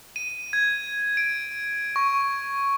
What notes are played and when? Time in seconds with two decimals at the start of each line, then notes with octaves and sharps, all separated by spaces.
0.16 D#7
0.53 G#6
1.17 D7
1.96 C#6